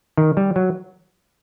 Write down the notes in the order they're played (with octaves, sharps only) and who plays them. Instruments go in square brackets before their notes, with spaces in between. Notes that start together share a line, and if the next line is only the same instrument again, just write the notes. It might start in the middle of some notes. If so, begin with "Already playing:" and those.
[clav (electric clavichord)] D#3
G3
F#3